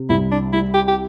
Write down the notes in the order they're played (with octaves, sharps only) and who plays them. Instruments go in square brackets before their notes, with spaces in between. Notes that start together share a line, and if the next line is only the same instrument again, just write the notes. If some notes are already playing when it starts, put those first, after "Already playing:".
Already playing: [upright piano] C3
[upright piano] C2 [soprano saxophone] E4
[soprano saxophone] D4
[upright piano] G3 [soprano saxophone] E4
[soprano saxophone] G4
G4